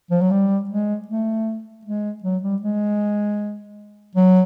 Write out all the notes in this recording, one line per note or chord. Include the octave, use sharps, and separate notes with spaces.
F3
F#3
G3
G#3
A3
G#3
F#3
G3
G#3
F#3